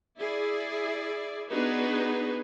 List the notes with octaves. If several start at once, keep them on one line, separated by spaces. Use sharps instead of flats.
E4 G#4 D5
B3 D4 D#4 F#4 G#4 B4